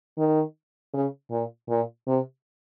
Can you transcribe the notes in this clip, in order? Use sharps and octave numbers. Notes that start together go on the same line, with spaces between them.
D#3
C#3
A#2
A#2
C3